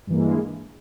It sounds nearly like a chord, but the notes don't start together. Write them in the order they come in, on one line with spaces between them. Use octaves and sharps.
G2 E3 A#3 G#3